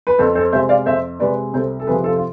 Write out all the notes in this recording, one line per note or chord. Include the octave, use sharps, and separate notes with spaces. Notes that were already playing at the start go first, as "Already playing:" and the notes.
B4
F2 A4 C5
A4 C5
C3 G#3 C5 E5
D5 F5
F2 C5 E5
C3 G#3 B4 D5
C2 A4 C5
A4
C3 F3 G#4 B4
F4 A4
F4